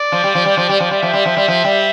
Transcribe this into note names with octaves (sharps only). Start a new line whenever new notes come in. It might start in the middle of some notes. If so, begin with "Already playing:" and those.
Already playing: D5
F3
G3
F3
G3
F3
G3
F3
G3
F3 E5
G3
F3
G3
F3
G3